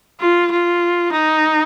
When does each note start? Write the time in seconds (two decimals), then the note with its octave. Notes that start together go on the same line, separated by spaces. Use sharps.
0.21 F4
0.51 F4
1.12 D#4